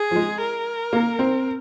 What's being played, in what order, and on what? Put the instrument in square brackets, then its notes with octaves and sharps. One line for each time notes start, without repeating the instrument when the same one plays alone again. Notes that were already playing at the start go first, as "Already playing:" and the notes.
Already playing: [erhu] G#4
[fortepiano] F3
G#3
[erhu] A#4
[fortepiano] A#3
C4